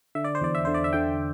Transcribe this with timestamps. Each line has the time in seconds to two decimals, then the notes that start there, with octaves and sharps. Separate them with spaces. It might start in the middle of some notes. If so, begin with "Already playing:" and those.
0.15 D3 E5
0.24 D5
0.35 C5
0.41 E2 D5
0.55 E5
0.65 D3 C5
0.74 D5
0.84 E5
0.93 D3 G5